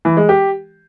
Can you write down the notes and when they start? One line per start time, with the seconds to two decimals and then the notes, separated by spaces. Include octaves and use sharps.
0.05 E3
0.17 G#3
0.29 G4